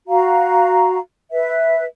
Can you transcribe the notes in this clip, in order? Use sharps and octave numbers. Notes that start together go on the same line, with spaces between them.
F#4 F5 A#5
B4 E5